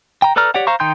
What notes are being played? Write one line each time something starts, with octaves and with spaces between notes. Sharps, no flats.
G5 A#5
A4 B4 D5 A#5 F6
G4 C#5 D5 F#5
C5 F5 A#5 C#6
D#3 D#4 G5 C6 G6